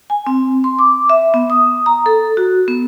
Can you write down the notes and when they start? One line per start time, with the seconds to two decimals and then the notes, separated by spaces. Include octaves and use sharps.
0.10 G#5
0.27 C4
0.64 C6
0.79 D6
1.10 E5
1.34 B3
1.50 D#6
1.86 A#5
2.06 A4
2.37 F#4
2.68 B3